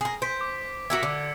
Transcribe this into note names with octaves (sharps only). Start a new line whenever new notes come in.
G#4 A#4
C5 B6 D7
D6
F#4 A#4 E5 G#6 C#7
D3 D6 E6